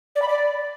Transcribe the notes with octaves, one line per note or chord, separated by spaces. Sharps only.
D5
B5
D5